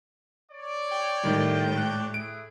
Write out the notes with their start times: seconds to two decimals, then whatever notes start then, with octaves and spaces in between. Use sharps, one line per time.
0.51 C#5 D5
0.92 G5
1.24 A2 D#3 G3
1.77 D4 G4 C#5 F#6
2.14 A3 E4 G#4 D7